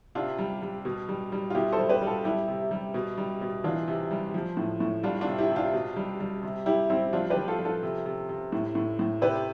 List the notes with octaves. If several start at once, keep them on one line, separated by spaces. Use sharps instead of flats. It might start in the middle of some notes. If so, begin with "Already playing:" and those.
C3 D4 F4
G3
G3
B2
G3
G3
F4
B2 E4 G4
A4 C5
G3
G4 B4
G3
F4 A4
G3 E4 G4
C3
G3
B2
G3
B2
E3 D4 F4
C3
G3
F3
A2
A2
G3 D4 F4
D4 F4
C3
E4 G4
C3
D4 F4
B2
G3
G3
C3
G3 E4 G4
G3 C4 E4
F3 D4 F4
G4 B4
F3
F4 A4
F3
F4 A4
C3
C3
C3
A2
A2
A2
C3 G4 B4